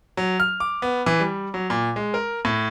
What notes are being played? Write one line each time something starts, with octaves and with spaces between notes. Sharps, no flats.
F#3
F6
D6
B3
E3
G3
F#3
A#2
G#3
A#4
A2